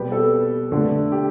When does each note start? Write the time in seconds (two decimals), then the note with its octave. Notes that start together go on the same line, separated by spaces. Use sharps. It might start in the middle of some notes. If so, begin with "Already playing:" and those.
Already playing: B2 G3 B3 G4 B4
0.12 A4
0.72 D3 A3
1.12 G4